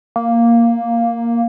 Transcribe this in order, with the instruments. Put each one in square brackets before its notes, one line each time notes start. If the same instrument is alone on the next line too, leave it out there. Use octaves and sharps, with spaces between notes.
[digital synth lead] A#3